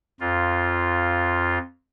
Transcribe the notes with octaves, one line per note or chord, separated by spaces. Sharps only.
F2 F4